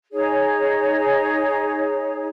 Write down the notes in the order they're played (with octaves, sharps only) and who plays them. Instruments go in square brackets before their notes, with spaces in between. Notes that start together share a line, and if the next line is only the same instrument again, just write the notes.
[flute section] D#4 G#4 C#5